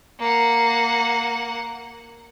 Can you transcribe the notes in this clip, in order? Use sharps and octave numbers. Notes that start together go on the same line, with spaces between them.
A#3 F#5